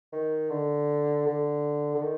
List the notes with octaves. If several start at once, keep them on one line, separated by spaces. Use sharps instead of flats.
D#3
D3
D3
D3
D#3